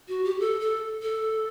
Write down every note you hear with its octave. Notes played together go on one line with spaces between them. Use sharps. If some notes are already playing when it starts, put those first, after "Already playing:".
F#4
G4
A4
A4
A4